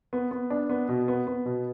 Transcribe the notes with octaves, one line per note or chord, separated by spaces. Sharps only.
B3
B3
D4
B3
B2
B3
B3
B2